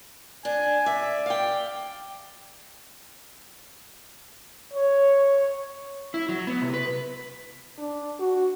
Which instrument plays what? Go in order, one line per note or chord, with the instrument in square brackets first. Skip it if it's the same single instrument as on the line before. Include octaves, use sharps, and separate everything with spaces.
[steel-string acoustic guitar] D4 [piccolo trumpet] G#5
[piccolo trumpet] D5 [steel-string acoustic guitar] E5
[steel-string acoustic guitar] F5 G5
[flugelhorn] C#5
[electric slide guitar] E4
F#3
B3
C3
B4
[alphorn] D4
F#4